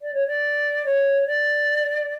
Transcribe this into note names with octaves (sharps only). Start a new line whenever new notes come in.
D5
C#5
D5
C#5
D5